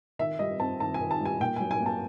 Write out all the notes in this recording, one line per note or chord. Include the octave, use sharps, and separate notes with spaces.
D#3 E5
G3 D#5
C4 A5
D#3 A5
G#5
D#3
A5
G3 G#5
A#2 G5
F#3 G#5
G#5
A#3
A5